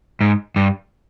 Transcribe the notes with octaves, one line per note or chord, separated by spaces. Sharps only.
G#2
G2